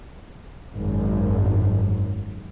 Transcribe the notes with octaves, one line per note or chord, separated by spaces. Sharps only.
G#1 F#2